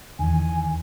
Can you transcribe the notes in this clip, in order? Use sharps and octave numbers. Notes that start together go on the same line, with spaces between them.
E2 D#3 G#5